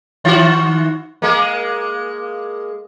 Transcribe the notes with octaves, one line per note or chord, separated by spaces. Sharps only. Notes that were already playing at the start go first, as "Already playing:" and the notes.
D#3 F#4
G#3 A#3